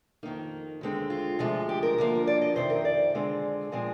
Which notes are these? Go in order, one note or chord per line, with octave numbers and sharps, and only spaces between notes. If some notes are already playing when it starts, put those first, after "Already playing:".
F2 D#3 A#3 D#4
D#2 D3 G#3 C4
F4
D2 C3 F3 G#3
G4
A#4
D2 D3 F3 A#3
D5
D#5
F2 C3 D#3 C4 C5
A#4
D5
F2 D3 G#3 C4
A#2 F3 G#3 C4 D#5